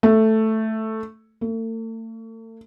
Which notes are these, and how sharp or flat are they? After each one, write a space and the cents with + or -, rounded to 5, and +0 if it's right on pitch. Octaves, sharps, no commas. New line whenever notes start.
A3 +0
A3 +40